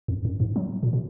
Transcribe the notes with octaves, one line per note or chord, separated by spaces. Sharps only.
F2
F#2
G#2
F#3
A#2
B2